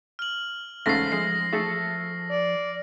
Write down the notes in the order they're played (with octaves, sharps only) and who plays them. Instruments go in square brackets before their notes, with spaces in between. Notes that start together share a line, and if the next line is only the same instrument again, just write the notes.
[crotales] F6 F#7
[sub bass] F1 [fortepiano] G#2 C#3 A3 [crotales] A#6 C7
[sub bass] F3 [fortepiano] G#3 [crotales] C7
[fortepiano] A3 G#4 A4
[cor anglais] D5